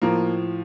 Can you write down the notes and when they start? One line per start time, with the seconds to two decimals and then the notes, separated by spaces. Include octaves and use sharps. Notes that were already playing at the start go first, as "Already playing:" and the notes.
0.02 A2 F3 A#3